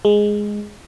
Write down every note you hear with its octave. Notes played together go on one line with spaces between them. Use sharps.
G#3